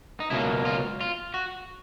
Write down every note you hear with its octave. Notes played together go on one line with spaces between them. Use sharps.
D#4
C#2 B2 F#3 A#3 E4
F4
F4
F#4